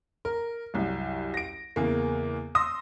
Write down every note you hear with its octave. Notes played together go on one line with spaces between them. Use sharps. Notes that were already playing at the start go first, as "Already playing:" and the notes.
A#4
C2 F#2
A#6 D7
E2 C#3 A#3
C6 D#6 E6 A#6